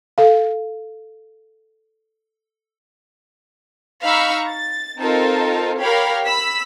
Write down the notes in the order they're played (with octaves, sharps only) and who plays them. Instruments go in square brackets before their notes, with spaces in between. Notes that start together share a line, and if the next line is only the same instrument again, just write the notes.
[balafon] A4 F5
[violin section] D#4 F5 A#5 B5 C#6 E6
A6
C4 D#4 F4 A4 A#4 A5
G4 A#4 C#5 F5 G5 B5
B5 E6 B6